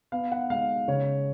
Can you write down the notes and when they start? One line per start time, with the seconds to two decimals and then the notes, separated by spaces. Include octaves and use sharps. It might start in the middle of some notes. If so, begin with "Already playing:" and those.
0.12 B3 F5
0.32 F#5
0.50 G#3 F5
0.88 C#3 C#5